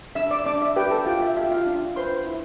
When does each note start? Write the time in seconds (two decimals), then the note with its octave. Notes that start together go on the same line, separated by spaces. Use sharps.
0.15 D4 E5 E6
0.31 D5 D6
0.46 D4 D5 D6
0.62 E5
0.76 G4 B4 G5
0.91 A4 A5
1.06 F4 G4 G5
1.22 E5
1.37 F4 E5
1.51 F4 F5
1.66 D4
1.96 B4 C5 C6
2.27 E4